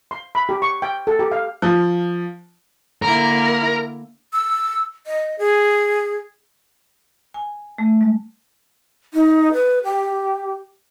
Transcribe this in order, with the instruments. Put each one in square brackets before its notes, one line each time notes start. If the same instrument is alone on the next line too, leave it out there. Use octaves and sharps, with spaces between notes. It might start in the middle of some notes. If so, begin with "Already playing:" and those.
[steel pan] C6
B5
G4
C#6
G5
A4
G4
F5
[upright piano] F3
[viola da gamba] D3 A#3 E4 [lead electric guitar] A#4
[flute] E6
D#5
G#4
[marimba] G#5
A3
G#3
[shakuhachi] D#4
B4
G4